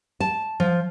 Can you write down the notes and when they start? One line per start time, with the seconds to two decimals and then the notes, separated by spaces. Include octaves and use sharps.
0.20 A5
0.60 F3